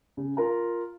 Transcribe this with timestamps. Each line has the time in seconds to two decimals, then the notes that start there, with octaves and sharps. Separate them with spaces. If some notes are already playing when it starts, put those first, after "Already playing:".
0.17 C#3
0.37 F4 A#4 A#5